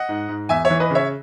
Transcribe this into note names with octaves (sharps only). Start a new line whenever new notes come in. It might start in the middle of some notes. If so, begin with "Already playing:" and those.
Already playing: D#5 F#5
G#2
G#2
E2 E5 G#5
C#5 E5
E3
B4 D#5
C#3 C#5 E5